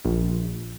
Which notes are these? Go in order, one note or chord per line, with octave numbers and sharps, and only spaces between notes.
A#1